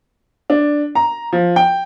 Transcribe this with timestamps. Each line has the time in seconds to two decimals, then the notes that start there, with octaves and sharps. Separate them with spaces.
0.50 D4
0.95 A#5
1.33 F3
1.56 G5